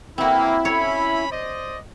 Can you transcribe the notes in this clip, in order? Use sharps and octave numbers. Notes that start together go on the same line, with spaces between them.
E3 A#3 C4 E4 F#4
C#4 C#5 B5
C5 D5 D#5